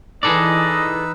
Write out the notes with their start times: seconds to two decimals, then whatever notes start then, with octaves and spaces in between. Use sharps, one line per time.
0.23 E3 D#4 G#4 A4 B4 D5 D#5 E6